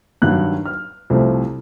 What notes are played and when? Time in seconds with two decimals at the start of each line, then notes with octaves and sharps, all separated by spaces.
0.22 G2 D#3 F#3 F#6
0.66 F6
1.10 C2 C3 F3 A3 C4